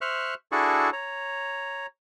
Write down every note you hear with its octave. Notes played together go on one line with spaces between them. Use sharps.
C5 E5 C#6 F6 F#6
D4 E4 F#4 G#4 A4 C#6
C#5 A#5